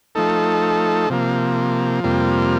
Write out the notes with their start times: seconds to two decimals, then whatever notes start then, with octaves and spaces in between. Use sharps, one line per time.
0.15 F3 A3 D#4 A4
1.10 C3 F3 A#3
2.04 F2 C3 G3 A#3 F4